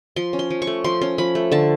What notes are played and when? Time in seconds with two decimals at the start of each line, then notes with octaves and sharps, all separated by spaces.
0.16 F3 C6
0.33 C#4
0.39 C6
0.50 F3
0.62 C#6
0.67 A3
0.84 F3 C6
1.01 C#4 C6
1.18 F3 B5
1.35 A3
1.51 D3 A5